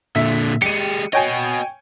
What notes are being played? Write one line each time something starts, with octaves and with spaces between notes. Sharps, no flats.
A#2 D3 E5
G#3 G4 C#7 D#7
F#4 C#5 D#5 G5 G#5